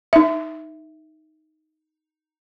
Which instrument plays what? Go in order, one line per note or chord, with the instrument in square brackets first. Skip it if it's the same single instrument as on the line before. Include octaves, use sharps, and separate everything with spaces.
[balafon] D#4 E5